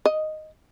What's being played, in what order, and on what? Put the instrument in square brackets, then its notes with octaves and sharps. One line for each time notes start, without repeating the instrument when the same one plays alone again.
[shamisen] D#5